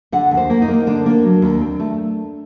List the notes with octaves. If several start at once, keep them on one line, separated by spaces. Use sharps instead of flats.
D3 F#5
D#2
C5
A#3
D#4
A#3
D3 D4
A#3
F#3
D#2
C4
A3